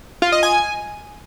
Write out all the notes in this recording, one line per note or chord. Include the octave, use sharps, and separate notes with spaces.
F4
D#5
G#5